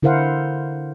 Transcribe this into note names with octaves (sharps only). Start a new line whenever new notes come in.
D3 E4 A#4 C5 F5 F#5